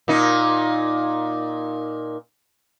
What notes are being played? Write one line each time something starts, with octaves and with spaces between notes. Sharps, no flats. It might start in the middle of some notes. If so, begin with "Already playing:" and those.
A#2 D#4